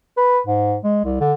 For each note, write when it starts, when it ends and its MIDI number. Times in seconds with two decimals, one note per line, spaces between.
0.17 0.39 71
0.47 0.76 44
0.84 1.01 56
1.05 1.18 36
1.20 1.33 50